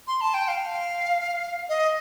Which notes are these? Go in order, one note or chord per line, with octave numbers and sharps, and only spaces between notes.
C6
A5
G5
F5
D#5